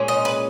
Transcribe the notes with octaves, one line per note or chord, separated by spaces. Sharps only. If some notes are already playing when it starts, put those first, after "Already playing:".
Already playing: A#2 G#3 C#4
D#5
B4